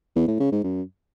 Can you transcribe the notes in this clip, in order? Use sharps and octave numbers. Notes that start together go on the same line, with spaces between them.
E2
A2
C#3
G#2
F#2